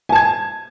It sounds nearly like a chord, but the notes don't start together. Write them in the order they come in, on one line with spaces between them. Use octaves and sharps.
G#5 A5 G#6